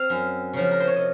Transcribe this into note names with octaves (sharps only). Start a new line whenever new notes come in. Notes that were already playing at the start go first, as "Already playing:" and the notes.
Already playing: C4 F5
F#2
C#3 F3
A#4
C5
C#5
C3 D#5